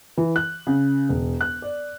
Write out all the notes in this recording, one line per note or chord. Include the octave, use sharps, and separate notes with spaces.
E3
F#6
C#3
E1
F#6
D5